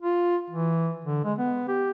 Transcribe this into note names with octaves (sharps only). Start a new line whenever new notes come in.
F4
E3
D3
G#3
B3
G4